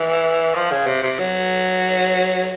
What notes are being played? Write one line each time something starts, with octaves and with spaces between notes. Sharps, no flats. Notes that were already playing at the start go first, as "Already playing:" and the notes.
Already playing: E3
F3
C#3
C3
C3
F#3